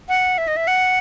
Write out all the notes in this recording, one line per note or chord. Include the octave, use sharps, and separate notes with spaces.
F#5
E5
D#5
E5
F#5